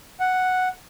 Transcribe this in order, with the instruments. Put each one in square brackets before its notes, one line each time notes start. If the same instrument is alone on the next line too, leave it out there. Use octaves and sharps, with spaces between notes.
[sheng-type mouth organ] F#5